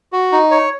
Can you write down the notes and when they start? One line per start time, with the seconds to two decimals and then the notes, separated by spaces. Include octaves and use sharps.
0.12 F#4
0.32 D#4
0.51 C#5